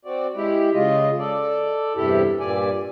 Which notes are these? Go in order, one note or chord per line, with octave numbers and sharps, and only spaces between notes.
C4 F#4 D5
G#3 E4 G4
C#3 G#3 F4 D#5
A4 D5
E2 G2 C3 E4 G4 A4
G2 A#2 D5 G#5